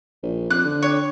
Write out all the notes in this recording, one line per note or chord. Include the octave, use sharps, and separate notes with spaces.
A#1
F2 F#6
D3
C#5